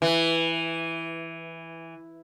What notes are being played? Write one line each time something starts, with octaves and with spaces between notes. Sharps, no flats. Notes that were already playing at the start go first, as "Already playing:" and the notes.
E3